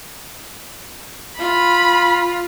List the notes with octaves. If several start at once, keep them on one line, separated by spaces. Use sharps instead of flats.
F4 B5